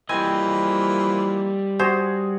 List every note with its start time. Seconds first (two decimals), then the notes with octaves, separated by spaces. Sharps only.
0.09 E3 F3 G3 A#3 C4 D#5 G#5
1.79 F#4 G#4 C5